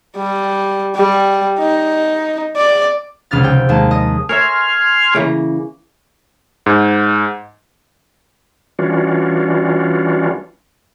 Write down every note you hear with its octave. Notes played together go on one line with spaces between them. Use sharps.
G3
G3
D#4
D5
F1 C#2 C3 F6 A6
C3 G5
D#2 G#3 A#3 A5
D#5
A#4 C#5 E5 G#5 C6 F6
C#3 E3 A#3
G#2
E3 G3 C#4 D4 F4 F#4